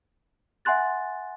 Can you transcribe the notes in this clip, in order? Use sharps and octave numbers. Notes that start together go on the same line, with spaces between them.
E5 F#5 G#5 C6 F#6 A6